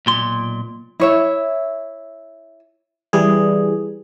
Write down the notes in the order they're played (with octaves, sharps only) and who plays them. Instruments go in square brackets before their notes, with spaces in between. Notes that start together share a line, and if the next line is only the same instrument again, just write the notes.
[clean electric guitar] B1 A#2 C6
[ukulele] E4 C#5 E5
[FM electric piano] E3 G3 G#4